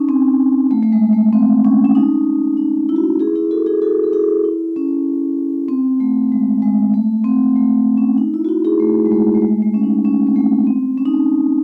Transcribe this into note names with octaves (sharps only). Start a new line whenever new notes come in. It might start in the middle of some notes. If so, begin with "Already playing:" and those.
Already playing: C#4 D#4
C4
A3
A3
G#3
A3
C4
C#4
C#4
D#4
D#4
E4
F#4
E4
E4 G#4
E4 G#4
F#4 A4
E4 G#4
F#4 A4
A4
E4 G#4
E4
C#4
C4
A3
G#3
G#3
A3
C4
A3
C#4
D#4
E4
F#4
E4
E4 G#4
A3
G#3
A3
A3
G#3
A3
C#4
D#4
C#4
C4
A3
C4
C#4
D#4
C#4